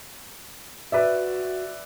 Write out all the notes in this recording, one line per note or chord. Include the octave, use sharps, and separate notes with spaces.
F#4 B4 D5 E5